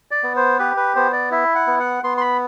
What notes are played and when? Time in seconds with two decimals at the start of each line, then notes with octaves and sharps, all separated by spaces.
0.11 D5
0.23 B3
0.36 C5
0.59 G4 B4
0.77 B4
0.96 B3 C5
1.13 D5
1.31 E4 E5
1.55 F#5
1.67 B3
1.80 F#5
2.04 B3 C6
2.18 C6
2.21 B5